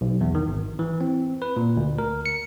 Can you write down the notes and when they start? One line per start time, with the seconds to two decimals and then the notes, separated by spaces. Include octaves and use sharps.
0.01 B1
0.21 E2
0.35 D#3
0.48 G#1
0.79 E3
1.01 C4
1.42 B4
1.57 A#2
1.77 D2
1.98 A#4
2.26 C#7